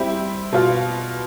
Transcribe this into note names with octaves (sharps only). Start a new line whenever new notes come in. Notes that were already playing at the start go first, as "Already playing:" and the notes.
Already playing: G3 C4 E4 G4
B2 B3 F4